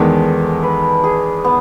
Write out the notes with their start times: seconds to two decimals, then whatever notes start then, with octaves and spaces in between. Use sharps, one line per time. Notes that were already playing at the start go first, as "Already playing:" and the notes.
Already playing: E2 D#3 G#3 B3 A4
0.63 B4
1.04 G#4
1.45 B3